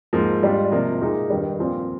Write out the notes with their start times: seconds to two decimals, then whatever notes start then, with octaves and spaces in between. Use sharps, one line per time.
0.13 G#2 F3 A#3
0.42 G#2 G3 D4 F4
0.72 C3 F3 A#3
1.01 A#2 G#3 D#4
1.30 G2 D#3 G3
1.59 A#2 F3 C4 F4